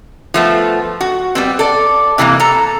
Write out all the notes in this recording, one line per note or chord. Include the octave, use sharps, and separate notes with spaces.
F3 A3 B3
F#4
G3 B3 C4
A4 D5
C3 E3 G#3 A#3
A4 A#5